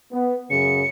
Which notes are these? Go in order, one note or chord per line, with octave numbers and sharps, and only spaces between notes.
B3
F#2 C#3 C#7